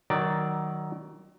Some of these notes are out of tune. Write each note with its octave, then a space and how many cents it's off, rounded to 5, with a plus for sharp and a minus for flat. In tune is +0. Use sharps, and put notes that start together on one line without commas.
D#3 +0 F#3 +20 D5 +0